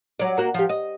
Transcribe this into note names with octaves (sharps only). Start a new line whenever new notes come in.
F#3 D5
A#3 F#4
F3 G4
D#5